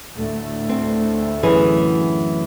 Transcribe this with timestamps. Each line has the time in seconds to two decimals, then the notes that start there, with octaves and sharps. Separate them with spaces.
0.15 D2 A2 A3
0.69 C4
1.43 F#2 E3 G#4